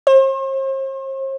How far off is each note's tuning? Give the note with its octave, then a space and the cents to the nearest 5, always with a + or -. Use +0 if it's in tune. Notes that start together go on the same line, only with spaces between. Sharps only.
C5 +45